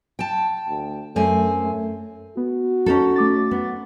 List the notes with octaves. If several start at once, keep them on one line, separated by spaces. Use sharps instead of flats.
G5 A5
D2
F#2 A3 C4 G#5
A3
B3 F#4
C#4 D#4 A4
A3 D6 A6
B3